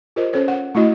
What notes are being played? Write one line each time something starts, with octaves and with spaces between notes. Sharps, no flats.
F4 G4 A#4 C5 D#5
C#4 A4 C5 C#5
F#5
A3 E4 F#4 D#5